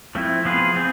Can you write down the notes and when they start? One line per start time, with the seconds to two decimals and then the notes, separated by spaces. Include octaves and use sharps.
0.15 F3 A3 C4 E4
0.45 F3 B3 F4 G#4 B4
0.76 C4 G#4